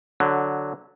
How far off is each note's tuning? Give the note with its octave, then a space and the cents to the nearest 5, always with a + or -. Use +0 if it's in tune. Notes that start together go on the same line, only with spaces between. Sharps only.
D3 +0 F#3 +0